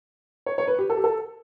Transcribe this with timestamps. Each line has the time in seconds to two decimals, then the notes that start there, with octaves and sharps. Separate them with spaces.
0.46 C#5
0.58 C#5
0.68 B4
0.79 G4
0.90 A4
0.97 G4
1.04 A4